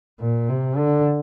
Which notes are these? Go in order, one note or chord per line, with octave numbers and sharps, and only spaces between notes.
A#2
C3
D3